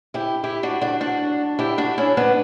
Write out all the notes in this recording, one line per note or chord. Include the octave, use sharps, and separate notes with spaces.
E4 G4
E4 G4
D4 F#4
D4 F#4
D4 F#4
E4 G4
D4 F#4
C#4 E4
B3 D4